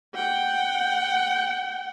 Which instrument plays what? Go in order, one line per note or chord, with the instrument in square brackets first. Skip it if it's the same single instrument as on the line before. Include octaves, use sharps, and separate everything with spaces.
[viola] F#5 G5